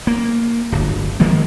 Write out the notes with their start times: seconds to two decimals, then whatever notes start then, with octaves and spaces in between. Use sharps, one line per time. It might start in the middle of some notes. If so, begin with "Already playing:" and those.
0.07 A#3
0.72 D1 G1
1.20 D#3 F3 G#3 A#3